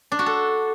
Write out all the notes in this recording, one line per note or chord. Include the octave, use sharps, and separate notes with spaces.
D4
F#4
A4